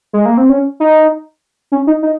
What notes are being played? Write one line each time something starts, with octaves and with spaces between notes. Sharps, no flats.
G#3
A#3
C4
C#4
D#4
C#4
D#4
D#4